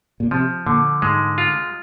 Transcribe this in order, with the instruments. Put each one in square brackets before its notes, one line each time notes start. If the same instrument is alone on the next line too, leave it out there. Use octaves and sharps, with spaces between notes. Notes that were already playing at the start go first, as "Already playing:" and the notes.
[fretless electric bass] A#2
[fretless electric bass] C3 [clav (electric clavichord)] F3
[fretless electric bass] A#2 [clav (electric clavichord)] D3
[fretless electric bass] G#2 [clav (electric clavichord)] G#3
[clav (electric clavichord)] F4